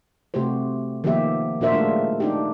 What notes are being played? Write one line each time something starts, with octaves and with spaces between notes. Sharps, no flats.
C3 A3 F#4 G4 C5
D#3 F3 A#3 B3 G4 E5
A#2 D4 F#4 A#4 C5 E5
G#3 A3 D4 F4
D4 D#4 G4